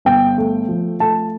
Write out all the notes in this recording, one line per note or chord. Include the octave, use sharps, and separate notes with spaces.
G1 G5
A3
F3
A3 A5